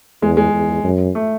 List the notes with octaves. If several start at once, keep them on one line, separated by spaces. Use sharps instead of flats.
E2 G#3
G#3
E2
F#2
A3